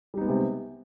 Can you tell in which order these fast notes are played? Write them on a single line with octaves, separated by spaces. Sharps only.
G3 D#4 B3 G#3 C3